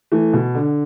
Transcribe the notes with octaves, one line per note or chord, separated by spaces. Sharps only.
E3 A3
B2
D3